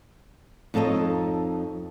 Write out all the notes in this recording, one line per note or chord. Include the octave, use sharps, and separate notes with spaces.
F2 D#4 A4 C#5 D#5